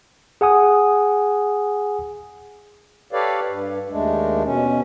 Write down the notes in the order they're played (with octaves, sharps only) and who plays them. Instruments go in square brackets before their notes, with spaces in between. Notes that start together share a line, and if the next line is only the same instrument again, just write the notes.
[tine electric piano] G#4 F#5 G#5 D#6
[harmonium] G4 A4 B4 C#5 D5 F5
G2
D#2 G#3 A3 D4
B2 C#4